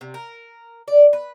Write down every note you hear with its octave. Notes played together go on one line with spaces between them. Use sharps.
C3
A#4
D5
B4